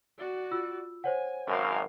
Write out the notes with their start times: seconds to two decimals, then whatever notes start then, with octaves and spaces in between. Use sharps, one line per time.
0.18 F#4 D5
0.51 F4 E6
1.04 C5 C#5 F#5 G#5
1.47 G#1 F#2 A#4 F5